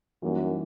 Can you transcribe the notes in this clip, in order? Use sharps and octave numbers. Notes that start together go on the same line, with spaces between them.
F#2 E3 G3 A#3 D#4 F#4